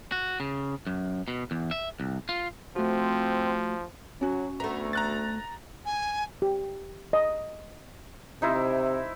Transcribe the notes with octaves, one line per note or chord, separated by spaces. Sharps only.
F#4
C#3
F#2
B2
E2
E5
C2
F4
F3 A3 C4 F#4
F#3 C#4 F#4
D2 A3 B3 A#5
A#5 F#6 A6
G#5
G4
D#5
C3 D#4 E4 C5